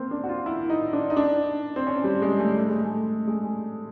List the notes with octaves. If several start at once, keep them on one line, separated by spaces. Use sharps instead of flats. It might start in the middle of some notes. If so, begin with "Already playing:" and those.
Already playing: A#3 C4
D4
F#4
F4
E4
D#4
D4
D#4
D4
C4
C#4
G3
G#3
A3
A3
G#3
A3
G#3